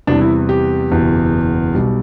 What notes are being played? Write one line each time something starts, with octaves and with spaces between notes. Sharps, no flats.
E2 C3 E3 G3 D4
E4
G4
F#1 E2 B2
B1 B2 G3